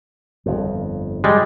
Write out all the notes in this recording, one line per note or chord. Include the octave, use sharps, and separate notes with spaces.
G1 F2
G3 G#3